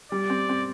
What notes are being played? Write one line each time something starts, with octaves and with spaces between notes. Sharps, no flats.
G3 D5
C4
C4